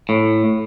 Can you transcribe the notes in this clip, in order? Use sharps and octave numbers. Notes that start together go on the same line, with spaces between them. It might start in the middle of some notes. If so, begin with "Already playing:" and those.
A2